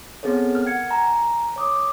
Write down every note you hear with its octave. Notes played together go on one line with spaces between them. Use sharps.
B3 C4 G#4 A4 C#5
A#4 F6
F#5 G#6 C#7
G#5 A#5
C#5 D6 D#6